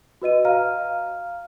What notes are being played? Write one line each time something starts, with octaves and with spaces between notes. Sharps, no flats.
F#4 B4 D#5 D#7
F5 A#5 F6